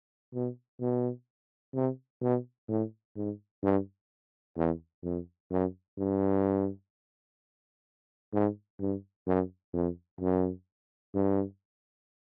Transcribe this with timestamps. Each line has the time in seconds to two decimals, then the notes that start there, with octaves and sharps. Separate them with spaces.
0.34 B2
0.80 B2
1.74 C3
2.21 B2
2.68 A2
3.16 G#2
3.63 G2
4.57 E2
5.03 F2
5.51 F#2
5.98 G2
8.33 G#2
8.80 G2
9.27 F#2
9.73 F2
10.21 F#2
11.14 G2